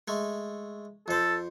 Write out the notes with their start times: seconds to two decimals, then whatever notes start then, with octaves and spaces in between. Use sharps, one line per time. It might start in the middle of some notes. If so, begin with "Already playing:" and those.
0.08 G#3 A3
1.08 F2 A4 C5